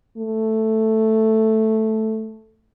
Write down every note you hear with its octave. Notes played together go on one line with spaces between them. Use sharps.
A3